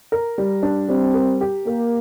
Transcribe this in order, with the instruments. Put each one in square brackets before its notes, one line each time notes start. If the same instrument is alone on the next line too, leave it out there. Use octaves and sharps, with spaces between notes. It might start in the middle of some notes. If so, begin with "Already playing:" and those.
[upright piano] A#4
G3
D4
[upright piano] G3 [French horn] C4
[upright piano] A#4
G4
[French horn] A#3 [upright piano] A#4